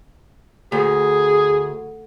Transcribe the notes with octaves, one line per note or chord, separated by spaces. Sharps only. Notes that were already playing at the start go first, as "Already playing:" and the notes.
D2 G#4